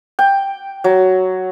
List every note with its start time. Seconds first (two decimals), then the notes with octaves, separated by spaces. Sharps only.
0.19 G5
0.84 F#3